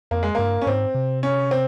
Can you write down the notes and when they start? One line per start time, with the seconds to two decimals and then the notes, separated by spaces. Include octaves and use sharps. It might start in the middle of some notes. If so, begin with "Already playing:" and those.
0.11 F2 A#3
0.23 G#3
0.35 G2 A#3
0.62 C#4
0.66 G#2 C4
0.94 C3
1.23 C#4
1.51 C4